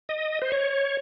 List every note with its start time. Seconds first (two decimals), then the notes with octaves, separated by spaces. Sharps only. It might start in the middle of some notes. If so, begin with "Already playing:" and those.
0.09 D#5
0.42 C5
0.52 C#5